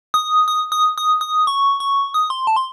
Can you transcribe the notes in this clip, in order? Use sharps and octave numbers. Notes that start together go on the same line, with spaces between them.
D#6
D#6
D#6
D#6
D#6
C#6
C#6
D#6
C6
A5
C6